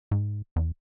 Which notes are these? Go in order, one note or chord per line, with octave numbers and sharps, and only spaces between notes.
G#2
E2